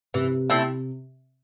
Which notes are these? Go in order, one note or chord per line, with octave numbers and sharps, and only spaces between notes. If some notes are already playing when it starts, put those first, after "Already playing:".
C3 E3
A3 C4 E4